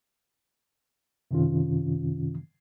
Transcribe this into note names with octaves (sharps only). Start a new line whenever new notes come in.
F#2 C3 D#3 C#4 F4